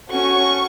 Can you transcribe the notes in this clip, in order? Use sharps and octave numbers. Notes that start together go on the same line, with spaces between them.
C#4 F#4 A4 C#6